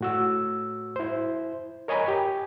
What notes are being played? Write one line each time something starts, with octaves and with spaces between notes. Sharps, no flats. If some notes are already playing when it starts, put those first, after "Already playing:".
A2 F#4 E6
E4 C5
A#4 C#5 D#5 G#5 A#5 B5
G4 G#5